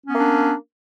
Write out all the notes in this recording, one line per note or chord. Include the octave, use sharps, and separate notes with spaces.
A#3 B3 C#4 D4